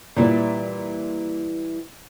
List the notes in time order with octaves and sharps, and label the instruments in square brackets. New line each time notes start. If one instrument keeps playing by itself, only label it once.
[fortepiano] A#2 [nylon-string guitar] E3 G3 E4